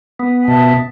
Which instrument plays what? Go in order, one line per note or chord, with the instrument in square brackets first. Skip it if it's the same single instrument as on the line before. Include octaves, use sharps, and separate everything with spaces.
[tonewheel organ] B3
[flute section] G5
[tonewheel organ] B2 [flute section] E5 A5